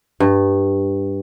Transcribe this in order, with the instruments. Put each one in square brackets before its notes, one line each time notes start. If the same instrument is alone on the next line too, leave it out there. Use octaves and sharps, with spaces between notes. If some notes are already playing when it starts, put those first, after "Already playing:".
[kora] G2